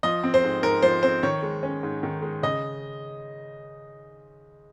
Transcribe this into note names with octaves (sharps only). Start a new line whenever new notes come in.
F3 D#5
C4
C5
G#2
G#2 A#4
F3 C5
C4 C5
D#3 C#5
G#3
C#4
G#2
D#3
G#3
C#3 D#5